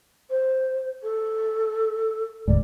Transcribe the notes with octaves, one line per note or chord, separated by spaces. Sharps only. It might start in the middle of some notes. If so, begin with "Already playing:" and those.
C5
A4
D#1 D2 G#2 D5